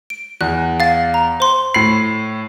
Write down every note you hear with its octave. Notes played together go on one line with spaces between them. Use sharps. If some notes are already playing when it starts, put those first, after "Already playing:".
D7
E2 F#6
F5 A6
A#5
C5 C6
A2 B5 C7